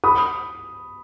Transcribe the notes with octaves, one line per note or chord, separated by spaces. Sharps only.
B5 D#6